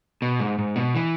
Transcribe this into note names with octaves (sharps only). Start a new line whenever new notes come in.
B2
G#2
G#2
B2
E3